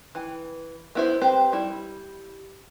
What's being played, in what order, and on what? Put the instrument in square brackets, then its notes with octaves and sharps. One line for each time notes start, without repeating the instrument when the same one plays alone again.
[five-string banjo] E3
B3 E4 C5
C4 G4 B4 C5
G3 E4